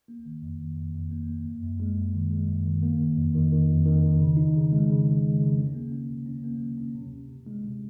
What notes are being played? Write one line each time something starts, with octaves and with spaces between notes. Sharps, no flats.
A#3
D#3
F2
D#3
F2
F2
A#3
A#3
F#2
F#2
G#3
F#2
D#3
G#3
F#2
D#3
A#3
D#3
F2
D#3
D#3
F2
D#3
D#3
C#3
D#4
C#3
G#3
C#3
C#3
G#3
C#3
C#4
A#3
C#4
C3
C#4
A#3
F#3
C#4
C3
C3
C3
G#3
C3